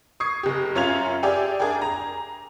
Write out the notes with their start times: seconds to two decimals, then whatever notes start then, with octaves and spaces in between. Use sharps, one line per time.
0.20 C#6 D#6 G#6 C7
0.43 F#1 G4
0.75 F#2 C#4 F4 G#6 F7
1.23 G4 G#4 D5 E5 G5 G#5
1.59 D4 G#4 A#4 D5 G5 G#5
1.82 A#5